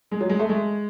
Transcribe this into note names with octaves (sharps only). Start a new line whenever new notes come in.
G#3
F#3
G#3
A3
G#3